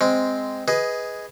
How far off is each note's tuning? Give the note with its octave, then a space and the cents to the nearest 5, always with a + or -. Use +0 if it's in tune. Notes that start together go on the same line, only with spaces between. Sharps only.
G#3 +0 C4 -10
G#4 +0 B4 +0 D#5 +15